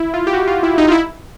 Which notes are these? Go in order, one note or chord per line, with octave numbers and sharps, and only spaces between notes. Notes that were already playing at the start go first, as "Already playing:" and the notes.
Already playing: E4
F4
G4
F#4
F4
E4
D#4
F4
E4